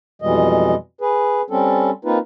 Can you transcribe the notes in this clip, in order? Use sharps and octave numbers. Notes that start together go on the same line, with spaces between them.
F2 B2 E3 G3 G#3 D#5
G#4 B4
G3 C4 C#4 A4
A#3 C4 D#4 F4 B4